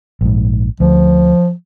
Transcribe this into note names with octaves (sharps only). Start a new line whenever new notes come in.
A#1 G#2
D2 F3